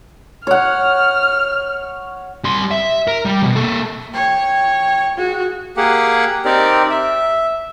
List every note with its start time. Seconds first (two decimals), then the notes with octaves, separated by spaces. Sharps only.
0.47 C#5 F#5 F6
2.44 G3 C6
2.71 E5
3.08 A#4
3.26 G3
3.41 D#2 B2
3.56 A#3 A4
4.14 C#5 G5
5.18 F#4 G#4
5.77 A#3 G4 G#4 F#5
6.45 C4 D#4 G4 A#4 D5
6.90 E5